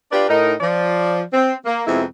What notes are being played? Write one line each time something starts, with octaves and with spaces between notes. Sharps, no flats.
D4 F4 G4 B4 D5
A2 D#4 A#4
F3 D5
C4
A#3
F2 C3 F3 G#3 B3 E4